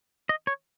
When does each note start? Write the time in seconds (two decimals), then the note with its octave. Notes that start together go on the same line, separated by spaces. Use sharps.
0.29 D#5
0.47 C#5